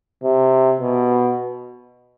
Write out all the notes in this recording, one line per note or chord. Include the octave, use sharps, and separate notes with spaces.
C3
B2